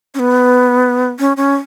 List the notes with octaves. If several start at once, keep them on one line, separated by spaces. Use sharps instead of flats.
C#4
B3
C#4
C#4